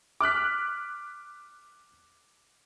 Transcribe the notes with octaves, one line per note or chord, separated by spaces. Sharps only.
D6 F6 F#6 B6